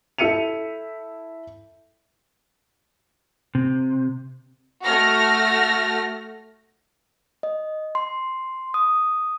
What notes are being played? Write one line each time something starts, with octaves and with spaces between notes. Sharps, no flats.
E4 A4 E5 C#7 D#7 F7
C3
A3 F#4 F6 A#6
D#5
C6
D#6